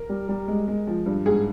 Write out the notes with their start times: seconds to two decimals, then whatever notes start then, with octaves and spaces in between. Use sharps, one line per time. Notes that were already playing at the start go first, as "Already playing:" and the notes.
Already playing: A#4
0.09 G3
0.29 G3
0.48 G#3
0.68 G#3
0.87 F3
1.06 G2
1.25 G#2 G#4